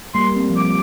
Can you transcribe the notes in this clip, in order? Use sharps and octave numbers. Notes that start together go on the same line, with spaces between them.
G3 A#3 C6
A3 C4
F3
G3 D6